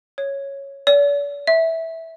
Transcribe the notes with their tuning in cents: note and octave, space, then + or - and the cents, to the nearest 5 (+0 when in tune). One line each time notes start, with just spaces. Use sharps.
C#5 -5
D5 -45
E5 -10